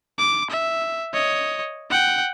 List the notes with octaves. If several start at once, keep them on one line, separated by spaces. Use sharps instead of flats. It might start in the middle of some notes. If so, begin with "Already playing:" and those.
D6
E5
C#5 D#5
F#5 G5